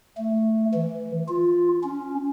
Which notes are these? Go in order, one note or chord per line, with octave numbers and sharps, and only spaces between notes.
A3
E3
F4
C#4